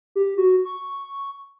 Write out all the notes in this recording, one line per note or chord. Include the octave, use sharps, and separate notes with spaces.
G4
F#4
C#6